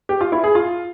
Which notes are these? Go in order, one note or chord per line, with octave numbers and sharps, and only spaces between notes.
G4
F4
E4
G#4
F4